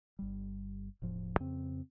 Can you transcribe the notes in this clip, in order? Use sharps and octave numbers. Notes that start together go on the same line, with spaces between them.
G1 G3
E1 A2 F3
F2 C#3 C4